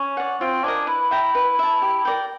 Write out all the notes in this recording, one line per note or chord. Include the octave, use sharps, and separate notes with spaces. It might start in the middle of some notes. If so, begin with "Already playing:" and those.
Already playing: C#4
D5 F#5
C4 F4
D4 A#4 D#5 G#5
E4 B4
E5 G5 A#5
B4
E5 A5
G4
A#4 D5 G5